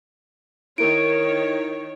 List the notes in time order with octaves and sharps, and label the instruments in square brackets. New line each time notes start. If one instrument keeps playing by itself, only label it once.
[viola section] D#3 C#5 [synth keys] E4 A#4 [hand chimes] D7